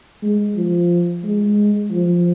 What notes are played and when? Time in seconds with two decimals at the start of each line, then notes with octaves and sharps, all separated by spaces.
0.22 G#3
0.56 F3
1.24 G#3
1.91 F3